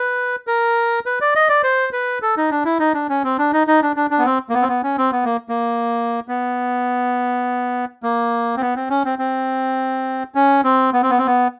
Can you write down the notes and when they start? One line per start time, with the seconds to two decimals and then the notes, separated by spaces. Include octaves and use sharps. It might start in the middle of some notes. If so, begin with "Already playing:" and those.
Already playing: B4
0.47 A#4
1.06 B4
1.21 D5
1.35 D#5
1.49 D5
1.63 C5
1.93 B4
2.22 A4
2.37 D#4
2.50 D4
2.65 E4
2.80 D#4
2.94 D4
3.10 C#4
3.24 C4
3.38 D4
3.53 D#4
3.67 D#4
3.82 D4
3.96 D4
4.10 D4
4.19 B3
4.25 C4
4.50 A#3
4.54 B3
4.62 C4
4.68 B3
4.83 C#4
4.98 C4
5.12 B3
5.24 A#3
5.49 A#3
6.28 B3
8.03 A#3
8.57 C4
8.61 B3
8.76 C4
8.90 C#4
9.05 C4
9.19 C4
10.35 C#4
10.64 C4
10.93 B3
11.02 C4
11.10 B3
11.19 C4
11.26 B3